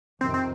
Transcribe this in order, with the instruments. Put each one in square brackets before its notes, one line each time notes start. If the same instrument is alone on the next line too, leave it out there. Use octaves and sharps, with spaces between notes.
[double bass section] F2 C3 D#3 [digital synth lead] C4
[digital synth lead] C4